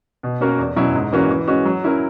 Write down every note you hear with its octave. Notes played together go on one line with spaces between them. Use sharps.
B2
A#3 C#4 F#4 A#4
E2
B2 F#3 C#4 E4
G#2
E3 A#3 C#4 F#4
E3
G#3 C#4 F#4
F#3
C#4 E4 A#4